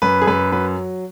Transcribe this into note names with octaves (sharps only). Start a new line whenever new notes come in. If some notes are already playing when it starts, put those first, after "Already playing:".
F#2 B4
G#4
F#2 B4
F#3 B4